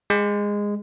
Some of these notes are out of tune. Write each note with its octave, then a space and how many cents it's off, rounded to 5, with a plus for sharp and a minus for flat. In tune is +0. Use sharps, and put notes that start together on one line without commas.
G#3 -15